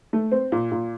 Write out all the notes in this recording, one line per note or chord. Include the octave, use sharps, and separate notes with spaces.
A3
C4
A#2
A#2